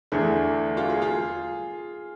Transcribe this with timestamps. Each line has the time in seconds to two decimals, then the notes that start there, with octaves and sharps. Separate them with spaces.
0.12 E2 D3 A3 D4 G#4
0.77 F4
0.89 G#4
1.02 F4